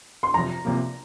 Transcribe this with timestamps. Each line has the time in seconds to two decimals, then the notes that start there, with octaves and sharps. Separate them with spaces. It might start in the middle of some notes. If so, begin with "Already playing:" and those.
0.23 C6
0.34 F2 C3 F3 A#5
0.65 C2 C3 F3 A#3